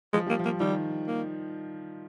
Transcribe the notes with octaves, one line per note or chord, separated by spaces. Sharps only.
F3 G#3
G3 A#3
F3
A#3
D#3 G3
A#3